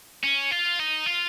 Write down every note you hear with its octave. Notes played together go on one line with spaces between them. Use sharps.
C#4
F4
D#4
F4